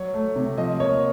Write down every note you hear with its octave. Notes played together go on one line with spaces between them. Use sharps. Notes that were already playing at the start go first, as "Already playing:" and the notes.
Already playing: F#3 C#5
A3
C3
F3 D#5
A#3 C#5